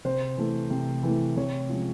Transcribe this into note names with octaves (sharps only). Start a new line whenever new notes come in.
C3 C5
E3 A3
C3
E3 A3
C3 C#5
F3 G#3 C#4